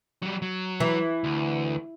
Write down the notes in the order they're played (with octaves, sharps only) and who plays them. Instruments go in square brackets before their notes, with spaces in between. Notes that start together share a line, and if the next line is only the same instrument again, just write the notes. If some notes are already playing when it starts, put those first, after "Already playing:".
[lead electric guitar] F#3 G3
F#3
[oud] E3
[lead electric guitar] D2